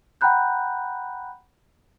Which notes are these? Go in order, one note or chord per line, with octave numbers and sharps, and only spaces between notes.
F#5 G5 A#5 B5 F#6 G6